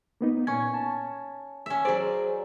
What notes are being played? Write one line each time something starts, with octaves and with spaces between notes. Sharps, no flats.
A#3 B3 D#4
A#2 C#4 C#6 G#6
A5
C#4 E5
F#3 G#4 C5 D5